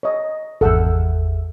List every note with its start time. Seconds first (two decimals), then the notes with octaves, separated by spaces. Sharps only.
0.03 C#5 D#5
0.61 G#1 E2 A4 F#5 E6